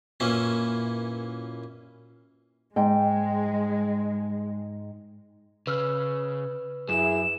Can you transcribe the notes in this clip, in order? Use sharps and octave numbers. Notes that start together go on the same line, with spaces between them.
F#2 A#2 E3 A#3 C#4 E4
G#2 G#3 G5
C#3 B4 E6 F6
F#2 E4 G#4 E7